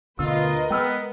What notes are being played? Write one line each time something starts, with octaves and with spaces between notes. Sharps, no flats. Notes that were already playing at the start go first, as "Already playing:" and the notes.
D2 B2 D3 F4 A#4 B4 D#5 E6
G#3 B3 G5 E6 F6